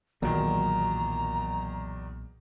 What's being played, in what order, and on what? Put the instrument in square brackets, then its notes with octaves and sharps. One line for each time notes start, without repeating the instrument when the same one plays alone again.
[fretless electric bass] B1 A#2 F#3 [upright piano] E2 D#3 [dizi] A#5